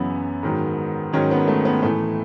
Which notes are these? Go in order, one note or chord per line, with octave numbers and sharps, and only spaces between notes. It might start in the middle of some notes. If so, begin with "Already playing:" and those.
Already playing: F#2 C#3 E3 B3
G#2 D#3 F#3
G#2 D#3 F#3 C#4
B3
A3
B3
A2 E3 A3